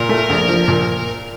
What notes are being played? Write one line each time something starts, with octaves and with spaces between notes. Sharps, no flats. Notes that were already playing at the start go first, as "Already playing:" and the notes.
Already playing: A#2 A#4
A3
A#1
F3
A#2